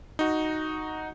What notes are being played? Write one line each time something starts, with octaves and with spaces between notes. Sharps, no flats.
D#4 F#4